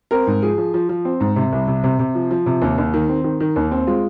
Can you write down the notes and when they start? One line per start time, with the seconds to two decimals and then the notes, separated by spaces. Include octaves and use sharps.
0.11 C4 A#4
0.27 G#2
0.42 F3 G#4
0.58 F3
0.74 F3
0.89 F3
1.05 C4
1.20 G#2
1.36 C3
1.52 C2
1.67 C3
1.84 C3
1.99 C3
2.15 F3
2.31 F3
2.46 C3
2.62 D#2
2.78 D#2
2.94 D#3
3.09 C4
3.24 D#3
3.40 D#3
3.56 D#2
3.71 C4
3.87 G#3 F4